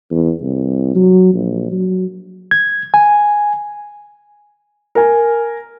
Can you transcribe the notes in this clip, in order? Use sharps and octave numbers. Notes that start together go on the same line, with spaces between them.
E2
C2
F#3
A#1
F#3
G#6
G#5
A#4 G#5